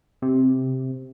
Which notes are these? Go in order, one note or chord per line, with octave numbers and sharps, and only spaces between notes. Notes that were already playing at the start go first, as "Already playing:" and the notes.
C3